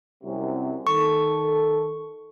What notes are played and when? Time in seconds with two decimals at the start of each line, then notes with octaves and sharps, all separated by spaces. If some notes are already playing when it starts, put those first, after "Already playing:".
0.24 C2 F#2 C3
0.87 D#3 A4 C#6